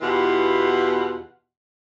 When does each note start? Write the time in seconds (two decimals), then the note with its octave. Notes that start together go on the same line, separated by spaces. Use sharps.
0.01 E2 B2 E3 F4 G4 F#5